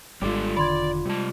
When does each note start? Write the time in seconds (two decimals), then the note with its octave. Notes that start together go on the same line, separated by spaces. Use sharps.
0.22 G#1 G3 G#3 D4 F4 G4 A4
0.57 E1 D3 D#3 D5 B5 C6 G#6
1.06 C3 G3 G#3 A5